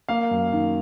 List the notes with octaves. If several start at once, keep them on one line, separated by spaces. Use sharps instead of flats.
A#3 F5
F#2
D#3